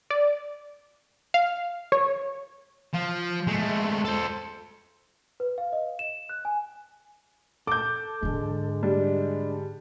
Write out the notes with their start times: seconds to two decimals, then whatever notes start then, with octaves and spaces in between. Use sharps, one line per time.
0.10 D5
1.34 F5
1.92 C#5
2.93 F3
3.47 G#3 A3
4.05 A4 C5
5.40 B4
5.58 F5
5.72 D#5
5.99 E7
6.29 F#6
6.45 G#5
7.67 A4 D6 G6
8.23 G#2 D3 G#3
8.83 G3 D4